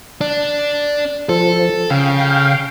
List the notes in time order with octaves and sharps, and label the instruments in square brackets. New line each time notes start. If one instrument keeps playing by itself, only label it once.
[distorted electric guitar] D4
[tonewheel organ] F3 [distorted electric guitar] A4
[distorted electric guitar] C#3 [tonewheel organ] F5 G5